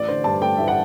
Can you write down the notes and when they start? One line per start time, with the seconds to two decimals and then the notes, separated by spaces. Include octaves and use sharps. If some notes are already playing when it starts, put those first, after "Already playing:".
Already playing: A1 D5
0.08 D3 C5
0.24 G2 A5
0.41 A3 G5
0.57 A1 E5
0.68 F#5